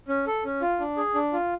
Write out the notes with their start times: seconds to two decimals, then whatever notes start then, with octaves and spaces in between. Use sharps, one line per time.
0.08 C#4
0.27 A4
0.45 C#4
0.62 F4
0.80 D4
0.97 G#4
1.15 D4
1.33 F4